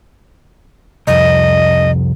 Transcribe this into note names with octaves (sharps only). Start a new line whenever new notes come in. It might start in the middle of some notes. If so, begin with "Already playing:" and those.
C2 F2 D#5